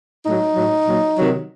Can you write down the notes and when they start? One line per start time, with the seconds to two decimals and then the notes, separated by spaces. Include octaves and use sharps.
0.24 A2 F#3 D#4
0.55 A2 F#3
0.87 A#2 F#3
1.18 C3 D#3 F#3